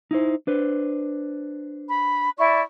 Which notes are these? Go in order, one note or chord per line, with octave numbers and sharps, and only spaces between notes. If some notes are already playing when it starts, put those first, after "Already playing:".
D#4 E4 C5
D4 B4 C5
B5
E4 D5 C#6